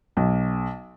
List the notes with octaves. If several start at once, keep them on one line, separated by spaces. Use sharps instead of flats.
B1